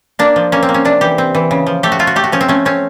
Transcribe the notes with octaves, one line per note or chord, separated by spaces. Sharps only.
A#3 D4
F3
A#3 C#4
C4
A#3
C#4
C3 D4
E3 G4
C4
E3
C#3
F3
A3 G4
F#4
A3 F4
F#4
A3 G4
F#4
F3 C#4
C4
A3 C#4
C4 C#4